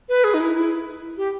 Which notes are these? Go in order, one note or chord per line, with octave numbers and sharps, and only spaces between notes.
B4
G#4
D#4
E4
E4
G4